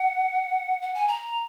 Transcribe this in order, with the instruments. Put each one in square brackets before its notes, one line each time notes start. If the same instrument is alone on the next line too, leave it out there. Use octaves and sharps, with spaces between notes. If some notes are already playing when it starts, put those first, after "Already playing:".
Already playing: [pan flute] F#5
F#5
G#5
A#5